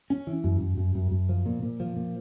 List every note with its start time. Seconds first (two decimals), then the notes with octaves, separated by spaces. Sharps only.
0.10 C#4
0.27 E3
0.44 F#2
0.61 F#2
0.77 F#2
0.95 F#2
1.11 F#2
1.29 F3
1.46 A#2
1.63 A#2
1.80 F3
1.96 A#2